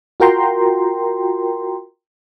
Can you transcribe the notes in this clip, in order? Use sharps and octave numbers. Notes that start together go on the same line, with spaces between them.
F4 F#4 A#4 G5 A#5 C6